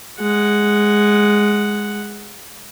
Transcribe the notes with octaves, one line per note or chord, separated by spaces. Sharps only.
G#3 F#5